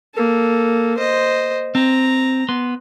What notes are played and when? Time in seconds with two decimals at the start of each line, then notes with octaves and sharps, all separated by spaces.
0.14 A#3 A4
0.97 C5 D#5
1.75 C4 A#5
2.49 B3 C6